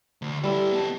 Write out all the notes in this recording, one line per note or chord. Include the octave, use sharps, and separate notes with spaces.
D2
G3 E4 A4 B4
B3 A5